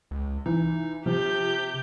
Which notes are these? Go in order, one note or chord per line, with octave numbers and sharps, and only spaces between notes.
C#2
E3 D#4
C3 F3 G4 G6